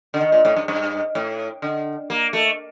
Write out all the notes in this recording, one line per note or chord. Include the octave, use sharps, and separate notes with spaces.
D3
D#3
A#2
A2
G2
G2
A2
D3
A#3
A3